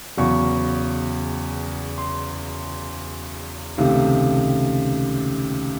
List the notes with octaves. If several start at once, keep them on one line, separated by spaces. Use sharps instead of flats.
E2 C#3 F#3 C#6
C6
C#2 C3 D#3 A3